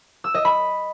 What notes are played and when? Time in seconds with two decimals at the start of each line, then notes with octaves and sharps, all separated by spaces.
0.24 E6
0.35 D#5
0.45 B5